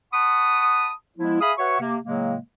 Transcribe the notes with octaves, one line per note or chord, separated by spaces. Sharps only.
F#5 A5 B5 C#6 D#6
F3 G#3 B3 E4
G#4 E5 F5 G#5 B5 D#6
F#4 B4 C#5 E5 F#5 C#6
C3 A#3
A2 C#3 F#3 G#3 A#3